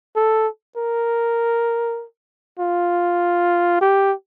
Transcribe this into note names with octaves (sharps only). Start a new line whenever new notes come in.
A4
A#4
F4
G4